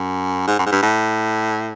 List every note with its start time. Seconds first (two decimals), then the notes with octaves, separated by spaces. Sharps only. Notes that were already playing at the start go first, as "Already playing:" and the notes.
Already playing: F#2
0.47 G#2
0.59 F#2
0.66 G#2
0.71 G2
0.82 A2